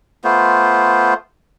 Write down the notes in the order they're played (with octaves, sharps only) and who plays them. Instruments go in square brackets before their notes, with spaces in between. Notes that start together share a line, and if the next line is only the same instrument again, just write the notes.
[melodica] A3 B3 F4 C5